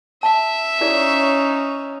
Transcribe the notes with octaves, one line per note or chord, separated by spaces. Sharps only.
E5 A5
C#4 D#4 E4 G#4 C#5 D5